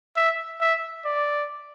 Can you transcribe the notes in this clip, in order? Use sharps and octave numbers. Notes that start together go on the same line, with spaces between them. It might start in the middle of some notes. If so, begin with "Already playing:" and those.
E5
E5
D5